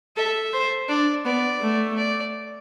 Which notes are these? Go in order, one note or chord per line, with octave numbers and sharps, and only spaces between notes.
A4 E5
C5
D4 D5
B3 D5
A3
D5